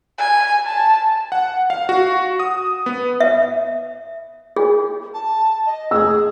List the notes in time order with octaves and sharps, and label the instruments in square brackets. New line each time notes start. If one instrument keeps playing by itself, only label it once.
[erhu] G#5
A5
[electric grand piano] F#5
F5
F#4
D#6
B3
[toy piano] E5
G#4
[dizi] A5
D#5
[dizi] G#4 [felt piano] E6